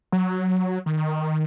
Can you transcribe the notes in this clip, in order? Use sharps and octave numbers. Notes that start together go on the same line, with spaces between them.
F#3
D#3